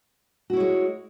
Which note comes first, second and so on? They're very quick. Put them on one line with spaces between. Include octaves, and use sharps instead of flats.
F#4 E4 C#5 G#3